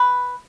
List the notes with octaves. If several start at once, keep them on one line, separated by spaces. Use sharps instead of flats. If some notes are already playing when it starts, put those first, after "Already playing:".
Already playing: B4